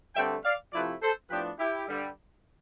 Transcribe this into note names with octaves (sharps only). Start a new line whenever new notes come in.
G2 D3 A3 C4 E5 G5
D5 F5
C3 F3 A3 E4 B4 D5
A4 C5
A2 F3 B3 D4 G4 B4
E4 G4
G2 D3 G3